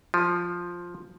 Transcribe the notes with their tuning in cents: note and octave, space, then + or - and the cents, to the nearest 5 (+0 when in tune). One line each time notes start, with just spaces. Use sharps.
F3 +5